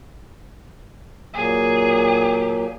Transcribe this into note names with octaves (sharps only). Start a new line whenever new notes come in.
A#2 F#3 A#3 G#4